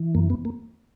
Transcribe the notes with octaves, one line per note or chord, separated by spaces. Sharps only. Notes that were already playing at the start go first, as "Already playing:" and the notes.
Already playing: E3
F#2 A#3
B3
A#3